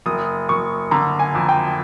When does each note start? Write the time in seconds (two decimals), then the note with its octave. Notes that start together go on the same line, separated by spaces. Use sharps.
0.06 F#1 D#6
0.49 F#1 C#6
0.91 D3 A#5
1.19 G#5
1.35 F2
1.49 G5